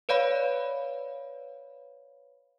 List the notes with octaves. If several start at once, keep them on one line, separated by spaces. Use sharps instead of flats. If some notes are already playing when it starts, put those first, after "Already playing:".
B4 C#5 D5 F5 B5